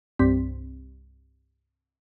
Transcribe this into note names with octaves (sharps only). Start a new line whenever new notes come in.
C2 G2 C4 B6